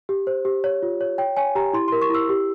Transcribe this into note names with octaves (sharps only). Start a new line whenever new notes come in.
G4
C5
G4
C#5
F4
C#5
C#5 G5
C#5 G#5
G4 A#5
E4 C6
A#4 C6
C#6
E4 E6
G4